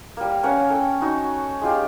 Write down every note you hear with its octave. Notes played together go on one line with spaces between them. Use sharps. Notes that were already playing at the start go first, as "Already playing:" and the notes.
G3 A#3
A#3 C#4 C#5 F#5
A4 G5
D#4 F#4 C#5
G#3 F4 G4